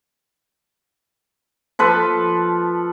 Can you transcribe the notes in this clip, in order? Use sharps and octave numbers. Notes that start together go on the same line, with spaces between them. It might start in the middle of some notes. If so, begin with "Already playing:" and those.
F3 A4 B4